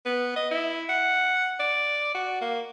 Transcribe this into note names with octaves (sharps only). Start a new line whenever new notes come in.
B3
D#5
E4
F#5
D5
F#4
A#3